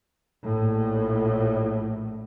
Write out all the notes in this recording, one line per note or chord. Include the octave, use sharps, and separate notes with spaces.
A#1 A2